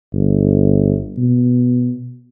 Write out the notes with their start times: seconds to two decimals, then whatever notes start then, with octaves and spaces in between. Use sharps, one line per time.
0.13 G1
1.18 B2